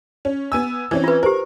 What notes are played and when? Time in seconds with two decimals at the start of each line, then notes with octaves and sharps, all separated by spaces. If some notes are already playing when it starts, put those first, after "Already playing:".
0.25 C#4
0.52 B3 G#5 E6
0.91 E3 C4 C#4
1.04 F4 B4
1.23 G4 A#4 C5